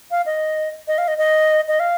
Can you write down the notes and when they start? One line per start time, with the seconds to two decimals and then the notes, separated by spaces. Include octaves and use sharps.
0.11 F5
0.26 D#5
0.88 D#5
0.98 F5
1.08 D#5
1.18 D#5
1.68 D#5
1.80 F5